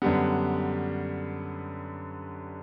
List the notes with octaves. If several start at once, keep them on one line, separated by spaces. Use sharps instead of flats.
F#2 D3 G3 B3